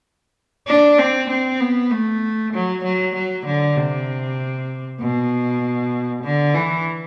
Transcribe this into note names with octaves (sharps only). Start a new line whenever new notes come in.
D4
C4
C4
B3
A3
F#3
F#3
F#3
D3
C3
B2
D3
E3